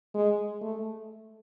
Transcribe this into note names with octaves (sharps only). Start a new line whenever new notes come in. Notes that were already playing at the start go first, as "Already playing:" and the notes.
G#3
A3